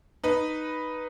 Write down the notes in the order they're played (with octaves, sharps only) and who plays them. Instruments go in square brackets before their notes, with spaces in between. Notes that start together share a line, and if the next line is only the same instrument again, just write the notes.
[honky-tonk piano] D#4 B4